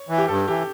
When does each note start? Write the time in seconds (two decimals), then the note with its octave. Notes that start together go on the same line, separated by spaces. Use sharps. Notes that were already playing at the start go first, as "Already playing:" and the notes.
Already playing: C#5
0.09 E3
0.18 G4
0.28 G2 A4
0.48 E3 G4